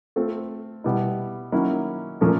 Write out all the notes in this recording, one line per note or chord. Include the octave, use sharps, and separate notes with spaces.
A3 C4 F4 A4
B2 G3 B3 E4
D#3 F#3 A#3 C#4 E4
A#2 F3 A3 C#4